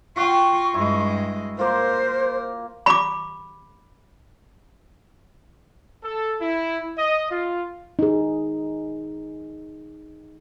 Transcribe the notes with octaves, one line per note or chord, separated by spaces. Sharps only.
F4 F#4 G5 C#6
G2 G#3 E4
A#3 F4 A#4 C5
B5 D6
A4
E4
D#5
F4
D#4 G#4